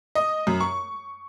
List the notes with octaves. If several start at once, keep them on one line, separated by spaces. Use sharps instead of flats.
D#5
F#2
C#6